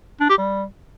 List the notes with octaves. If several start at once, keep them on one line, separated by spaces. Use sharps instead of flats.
D4
G4
G3